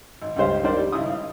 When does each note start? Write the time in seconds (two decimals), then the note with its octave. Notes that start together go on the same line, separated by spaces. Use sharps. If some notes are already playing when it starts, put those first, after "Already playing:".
0.21 G#1
0.36 C#2 G2 G4 C5 F5
0.63 D#3 D4 A#4 C5 D5
0.77 G3
0.92 G#1 C#3 E4 D#6
1.10 F5